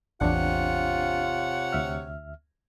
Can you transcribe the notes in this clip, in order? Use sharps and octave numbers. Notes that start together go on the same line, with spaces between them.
A1 E2 C3 D4 F4 C#5 F#5
D2 E5 F6